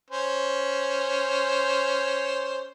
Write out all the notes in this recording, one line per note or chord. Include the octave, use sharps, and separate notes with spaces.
C#4 C5